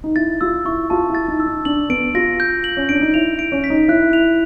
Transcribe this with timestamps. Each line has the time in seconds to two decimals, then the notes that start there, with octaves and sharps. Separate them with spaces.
0.04 D#4
0.16 E4 A6
0.41 F4 E6
0.65 E4 C#6
0.90 F4 A5
1.09 E4
1.15 A6
1.28 D#4
1.40 E6
1.46 D#4
1.65 D4 F#7
1.89 B3 D7
2.14 F4 A#6
2.40 G6
2.64 F#7
2.77 C#4
2.89 D4 D7
3.01 D#4
3.14 E4 F7
3.39 D7
3.52 C#4
3.64 B6
3.70 D#4
3.88 E4 F#6
4.13 F7